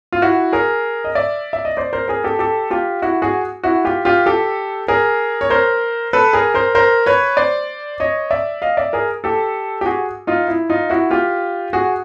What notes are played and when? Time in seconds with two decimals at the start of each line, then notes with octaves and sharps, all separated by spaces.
0.12 F4
0.22 E4 F#4
0.52 G#4 A#4
1.04 D#5
1.15 D5 E5
1.53 E5
1.65 D#5
1.77 C5 D5
1.93 A#4 C5
2.08 G#4 A#4
2.24 G4 A4
2.39 G4 A4
2.71 F4 G4
3.02 E4 F#4
3.22 F#4 G#4
3.63 E4 F#4
3.85 F4 G4
4.05 F4 G4
4.26 G4 A4
4.88 G#4 A#4
5.41 C#5
5.50 A#4 C5
6.13 A4 B4
6.33 G#4 A#4
6.54 A#4 C5
6.75 A#4 C5
7.06 B4 C#5
7.37 C5 D5
8.00 C#5 D#5
8.31 D5 E5
8.62 D#5 F5
8.77 D5 E5
8.93 G#4 A#4
9.24 G4 A4
9.81 G4
9.86 F#4 G#4
10.27 D#4 F4
10.48 E4
10.70 D#4 F4
10.90 E4 F#4
11.11 F4 G4
11.73 F#4 G#4